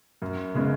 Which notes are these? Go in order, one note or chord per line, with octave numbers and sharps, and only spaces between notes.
F#2
C#3 G#3 B3